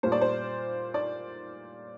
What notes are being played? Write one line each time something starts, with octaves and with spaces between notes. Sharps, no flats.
A#2 G3 A#3 C5
D5
C5
D5